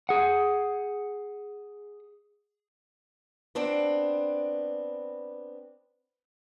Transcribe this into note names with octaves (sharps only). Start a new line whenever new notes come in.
G#4 F#5
B3 C4 D4